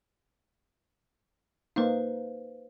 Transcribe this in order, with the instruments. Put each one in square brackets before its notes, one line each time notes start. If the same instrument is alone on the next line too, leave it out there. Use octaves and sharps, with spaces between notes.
[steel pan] A#3 D#4 [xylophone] B4 C5 F5